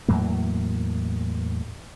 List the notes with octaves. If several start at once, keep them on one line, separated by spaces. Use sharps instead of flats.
E2 A2 F#3 A#3